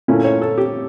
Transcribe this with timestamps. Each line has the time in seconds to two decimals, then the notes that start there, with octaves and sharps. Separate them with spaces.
0.08 A#2 A3 C#4 E4
0.24 C#5
0.42 A4
0.58 G4